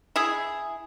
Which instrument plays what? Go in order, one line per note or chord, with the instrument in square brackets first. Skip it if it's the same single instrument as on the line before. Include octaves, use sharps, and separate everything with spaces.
[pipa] E4 G#4